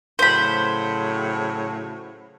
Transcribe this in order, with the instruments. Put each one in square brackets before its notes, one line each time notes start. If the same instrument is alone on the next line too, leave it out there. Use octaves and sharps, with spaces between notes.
[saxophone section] A2 C#3 F#3 [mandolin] C5 B5